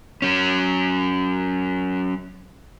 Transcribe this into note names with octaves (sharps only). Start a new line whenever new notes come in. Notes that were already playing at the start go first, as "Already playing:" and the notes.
F#3 C#4